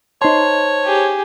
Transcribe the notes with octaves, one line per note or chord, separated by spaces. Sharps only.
D#4 C5 C#5 A5 C6
G4 G#4